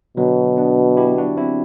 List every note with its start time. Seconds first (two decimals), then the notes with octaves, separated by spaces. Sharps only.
0.17 B2 D3 F#3
0.57 B3 D4
0.97 E4 G4
1.18 D4 F#4
1.37 C4 E4